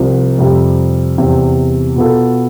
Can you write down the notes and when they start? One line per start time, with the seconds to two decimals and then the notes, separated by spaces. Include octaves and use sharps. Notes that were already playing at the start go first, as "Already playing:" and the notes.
Already playing: C2 C3 F3
0.39 F2 C3 G3
1.18 E2 C3 G3
1.96 B2 B3 F4 A4